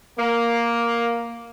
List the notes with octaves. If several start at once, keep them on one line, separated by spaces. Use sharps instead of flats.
A#3